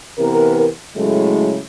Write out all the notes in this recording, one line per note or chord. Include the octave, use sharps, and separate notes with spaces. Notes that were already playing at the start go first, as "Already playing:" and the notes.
C3 E3 B3 A#4
A2 C#3 F#3 G#3 A3 E4